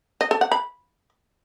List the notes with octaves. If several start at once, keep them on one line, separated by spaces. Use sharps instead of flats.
D#5
A4
F#5
B5